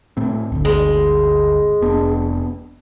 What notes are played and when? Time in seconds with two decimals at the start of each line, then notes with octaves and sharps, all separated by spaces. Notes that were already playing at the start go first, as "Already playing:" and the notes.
0.17 A2 A3 C4
0.52 G1 D2
0.65 G#3
1.81 F1 B3 D4